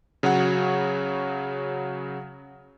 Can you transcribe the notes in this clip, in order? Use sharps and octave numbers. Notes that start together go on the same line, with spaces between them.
C#3 F#3 F#4 C#5 F#5